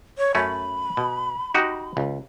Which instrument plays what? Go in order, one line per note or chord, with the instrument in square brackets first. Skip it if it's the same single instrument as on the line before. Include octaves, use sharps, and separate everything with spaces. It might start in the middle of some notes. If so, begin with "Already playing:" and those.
[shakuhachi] C#5
[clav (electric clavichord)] F#2 A3 C#4 [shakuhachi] B5
[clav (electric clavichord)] B2
D#4 F#4 G4
C#2